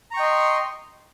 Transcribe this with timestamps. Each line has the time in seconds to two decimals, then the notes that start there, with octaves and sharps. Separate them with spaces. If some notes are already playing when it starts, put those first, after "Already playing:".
0.11 A#5
0.14 C#6
0.17 G5
0.20 D#5
0.23 C6